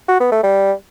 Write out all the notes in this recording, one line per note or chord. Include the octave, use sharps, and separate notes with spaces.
F#4
B3
A3
G3